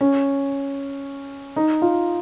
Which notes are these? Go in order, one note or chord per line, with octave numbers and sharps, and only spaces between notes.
C#4
D#4
F4